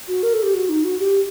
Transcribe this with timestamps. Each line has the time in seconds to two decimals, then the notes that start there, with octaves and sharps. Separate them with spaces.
0.08 F#4
0.23 A#4
0.33 A4
0.43 G4
0.54 F#4
0.69 D#4
0.84 F#4
0.99 G4